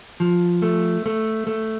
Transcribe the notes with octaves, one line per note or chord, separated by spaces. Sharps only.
F3
A3
A3
A3